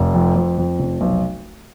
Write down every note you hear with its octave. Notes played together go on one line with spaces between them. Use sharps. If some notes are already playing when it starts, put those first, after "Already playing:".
Already playing: F1
F2
F2
F2
F1
B1